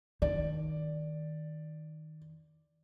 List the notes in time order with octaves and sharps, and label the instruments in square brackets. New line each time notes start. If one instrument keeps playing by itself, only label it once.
[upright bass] D#3 [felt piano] D5